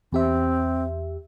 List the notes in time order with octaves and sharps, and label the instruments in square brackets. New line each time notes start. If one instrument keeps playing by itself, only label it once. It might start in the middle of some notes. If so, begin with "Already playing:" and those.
[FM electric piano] E2 G4 E5 [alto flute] C4